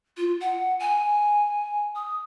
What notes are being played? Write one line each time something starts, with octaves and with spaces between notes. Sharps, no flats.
F4
F#5
G#5
D#6